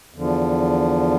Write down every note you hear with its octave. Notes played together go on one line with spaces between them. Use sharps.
E2 D3 F3